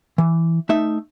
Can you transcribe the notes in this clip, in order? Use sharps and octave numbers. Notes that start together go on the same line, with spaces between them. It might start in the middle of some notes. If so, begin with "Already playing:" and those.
E3
A3 D#4 E5